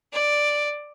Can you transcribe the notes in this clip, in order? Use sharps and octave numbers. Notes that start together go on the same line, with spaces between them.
D5